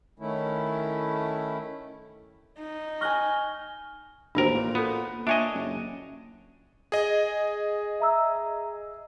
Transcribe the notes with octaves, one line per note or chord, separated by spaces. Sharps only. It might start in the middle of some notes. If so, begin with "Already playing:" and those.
D#3 A3 C#4 E4
D#4
G#5 C#6 F6 F#6 A#6 G7
A1 D#2 D4 F#4 A#4 C5
A#2
B3 F4 A4
A#2 D4 C#5 D#5 E5 G#5
F#1
G#4 D#5
E5 A#5 E6